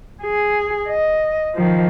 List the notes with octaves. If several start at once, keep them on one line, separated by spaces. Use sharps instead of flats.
G#4
D#5
D#3 F3